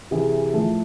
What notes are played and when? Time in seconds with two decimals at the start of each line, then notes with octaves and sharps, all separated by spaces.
0.11 C3 E3 G#4
0.53 A2 F3 A4